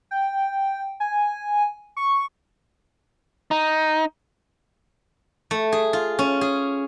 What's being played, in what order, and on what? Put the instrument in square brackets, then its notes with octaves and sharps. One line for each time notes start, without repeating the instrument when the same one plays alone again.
[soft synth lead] G5
G#5
C#6
[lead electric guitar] D#4
[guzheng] A3
G#4
F4
C#4
G#4